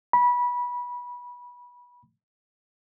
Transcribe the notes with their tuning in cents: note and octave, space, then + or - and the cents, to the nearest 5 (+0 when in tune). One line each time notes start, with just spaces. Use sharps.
B5 -20